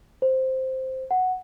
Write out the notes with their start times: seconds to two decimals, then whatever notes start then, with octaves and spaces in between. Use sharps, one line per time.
0.22 C5
1.11 F#5